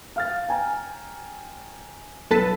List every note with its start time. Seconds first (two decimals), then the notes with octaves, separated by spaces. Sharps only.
0.16 F5 F6 A6
0.49 G5 G#5 A#5
2.31 B1 A4 B4 A5 B6